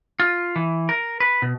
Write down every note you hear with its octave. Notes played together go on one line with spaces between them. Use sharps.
F4
E3
A#4
B4
B2